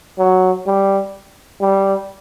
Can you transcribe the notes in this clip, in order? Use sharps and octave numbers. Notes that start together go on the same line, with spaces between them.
F#3
G3
G3